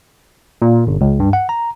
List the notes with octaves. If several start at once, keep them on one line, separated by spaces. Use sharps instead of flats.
A#2
G1
C#2
G2
F#5
A#5